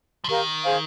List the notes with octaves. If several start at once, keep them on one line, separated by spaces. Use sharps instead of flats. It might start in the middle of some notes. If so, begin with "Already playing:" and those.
F3
D#3 G4 A#4 F5 A#5
G#4 C5 F5 G#5